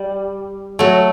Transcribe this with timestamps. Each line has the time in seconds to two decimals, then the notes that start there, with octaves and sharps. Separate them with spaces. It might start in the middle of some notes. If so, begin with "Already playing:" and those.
Already playing: G3
0.79 F#3 A3